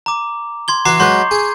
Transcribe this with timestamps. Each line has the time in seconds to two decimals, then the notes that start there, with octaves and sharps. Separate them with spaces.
0.06 A#5 D6
0.68 C6 G#6 G7
0.85 E3 F#4 A#5 D6 C7
1.00 F#3 G#3 B4 C6 C#6 G6
1.31 G#4